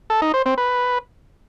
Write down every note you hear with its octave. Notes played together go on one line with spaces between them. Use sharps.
A4
D#4
C5
C4
B4